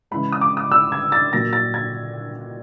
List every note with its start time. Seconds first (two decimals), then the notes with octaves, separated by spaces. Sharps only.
0.11 C#3 E3 G#3 B5
0.32 D#6
0.41 D6
0.57 D#6
0.72 E6
0.92 G#6
1.12 A6
1.33 A#2 F#3 A#3 A#6
1.53 A6
1.74 G#6